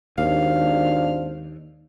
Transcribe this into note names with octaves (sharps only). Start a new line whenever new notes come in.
G#1 D#2 D4 C5 F5